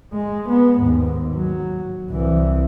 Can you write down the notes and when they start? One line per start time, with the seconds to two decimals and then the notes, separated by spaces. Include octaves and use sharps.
0.13 G#3
0.50 B3
0.79 D#2 G#2
1.35 F#3
2.10 C2 E3